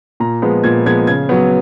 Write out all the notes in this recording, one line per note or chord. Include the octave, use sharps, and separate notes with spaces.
A#2 A#5
F3 G#3 B3
A#2 G#6
F3 G#3 B3 G#6
C#3 G#6
F#3 B3